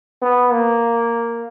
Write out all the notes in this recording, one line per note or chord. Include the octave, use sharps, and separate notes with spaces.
B3
A#3